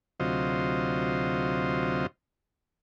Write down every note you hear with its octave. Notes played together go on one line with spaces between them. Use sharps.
D2 C3 F#3 F4 C5 D#5